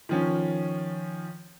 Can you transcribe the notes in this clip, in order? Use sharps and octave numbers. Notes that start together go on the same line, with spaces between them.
D#3 F3 C#4